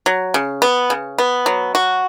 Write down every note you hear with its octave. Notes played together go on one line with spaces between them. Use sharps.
F#3
C#3
B3
C#3
B3
F#3
F#4